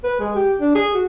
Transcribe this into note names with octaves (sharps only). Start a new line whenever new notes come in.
B4
G#3
G4
D4
G#4
F#4